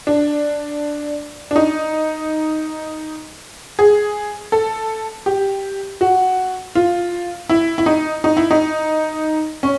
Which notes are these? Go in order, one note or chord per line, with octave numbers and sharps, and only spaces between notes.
D4
D4
D#4
G#4
A4
G4
F#4
F4
E4
E4
D#4
D#4
E4
D#4
C#4